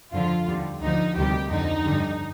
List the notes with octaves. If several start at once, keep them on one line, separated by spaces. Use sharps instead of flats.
F2 D3 F3 F4
D#2 D3 G3
D2 D3 F3 D#4
D2 C3 D#3 G3 G4
F2 D3 F3 D#4
G2 D3 G3